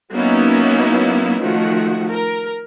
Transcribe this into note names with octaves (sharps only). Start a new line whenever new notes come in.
F#3 A#3 B3 C#4 D#4 E4
D#3 F3 A3 F#4
A#4